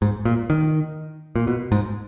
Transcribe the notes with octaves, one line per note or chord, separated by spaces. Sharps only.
G#2
A#2
D#3
A#2
B2
G#2